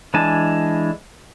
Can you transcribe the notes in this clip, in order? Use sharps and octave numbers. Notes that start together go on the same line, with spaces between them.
E3 G#3 D4 G#5 A5